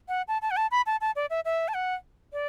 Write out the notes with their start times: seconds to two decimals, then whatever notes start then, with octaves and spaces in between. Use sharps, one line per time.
0.08 F#5
0.28 A5
0.42 A5
0.51 F#5
0.57 A5
0.71 B5
0.86 A5
1.01 A5
1.16 D5
1.30 E5
1.45 E5
1.68 A5
1.74 F#5
2.33 D5